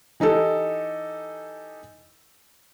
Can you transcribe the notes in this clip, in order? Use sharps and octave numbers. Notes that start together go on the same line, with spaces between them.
E3 D#4 G4 A4